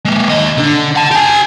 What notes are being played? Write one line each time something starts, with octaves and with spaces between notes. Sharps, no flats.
G#3 A#3
D#2 D#5
D3 D4
F#5 A5
G4 G#5